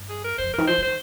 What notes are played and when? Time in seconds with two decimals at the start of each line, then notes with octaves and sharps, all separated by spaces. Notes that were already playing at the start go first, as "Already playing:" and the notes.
Already playing: G2
0.09 G#4
0.24 A#4
0.38 F2 C5
0.49 G2 A#4
0.58 D#3
0.67 F3 C5
0.78 G3
0.83 D#3 C5